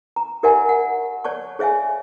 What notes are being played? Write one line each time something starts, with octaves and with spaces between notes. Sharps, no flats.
A#5
G4 A#4 D5 E5 F#5 G#5
F#5
C#5 D5 A5 C#6
G#4 C#5 E5 F5 G#5